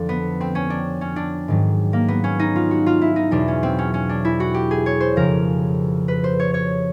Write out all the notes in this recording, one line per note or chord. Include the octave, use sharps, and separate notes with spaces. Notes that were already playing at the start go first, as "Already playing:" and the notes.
Already playing: F2 D3 F3 D4
B3
C4
C#4
D4
C#4
D4
G#2 D#3 F#3
A#3
B3
C#4
D#4
F4
F#4
F4
E4
D#4
E2 B2 F#3 D4
C#4
C4
C#4
C#4
D4
E4
F#4
G4
G#4
C#5
C5
F2 C#3 F3 A#4
B4
C5
C#5
C#5